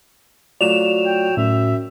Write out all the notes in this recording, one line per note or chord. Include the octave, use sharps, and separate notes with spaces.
F#3 A3 F4 D5 E7 F7
G5
F#2 A2 E5